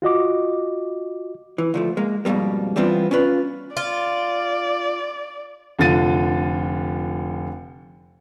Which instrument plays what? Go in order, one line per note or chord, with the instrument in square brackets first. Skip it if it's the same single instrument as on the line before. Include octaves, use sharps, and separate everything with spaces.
[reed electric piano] F4 F#4 D#5 D6
[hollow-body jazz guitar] E3
D2 F3 A3
G#3 A#3
F2 G#2 B2 G3 A#3
E3 G3 B3 C4 D4 F4
C#4 D4 F4 B4
[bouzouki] F4 [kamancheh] D5
[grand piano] F1 D3 F4 A6 D#7